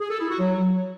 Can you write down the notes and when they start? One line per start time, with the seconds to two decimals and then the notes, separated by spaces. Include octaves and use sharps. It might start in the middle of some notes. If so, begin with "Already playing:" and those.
0.01 G#4
0.10 A4
0.20 E4
0.30 F#4
0.40 F#3